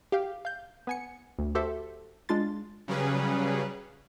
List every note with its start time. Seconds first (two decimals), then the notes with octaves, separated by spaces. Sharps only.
0.12 G4 F5 G5
0.45 F5 G6
0.87 B3 G#5 C#7
1.39 D2
1.55 F#4 G4 A4 C5 E5
2.29 G#3 D4 F4 C6 A6
2.88 C#3 F#3 G3 C#4 G#4 B4